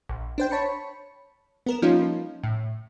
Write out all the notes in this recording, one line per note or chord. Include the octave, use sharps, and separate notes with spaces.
A#1
D4 C5 G5
C#5 A5 B5 C#7
B3 A#4 E7
F3 G3 A#3 C#4 D#4 F4
A2